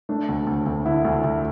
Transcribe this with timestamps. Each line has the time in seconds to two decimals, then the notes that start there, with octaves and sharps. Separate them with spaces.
0.09 A3 D4
0.29 D2
0.47 D2
0.66 D2
0.85 D3 E4
1.05 D2
1.24 D2